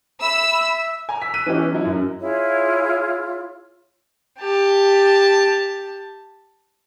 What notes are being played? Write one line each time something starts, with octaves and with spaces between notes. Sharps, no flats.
E5 B5 E6
G#5 A#5
E6 B6
E6 F#6 B6 D#7
E3 B3 C#4 G4 D#5
F#3 D#4 E4
F#2 F#3
E4 F4 G#4 C#5
G4 A5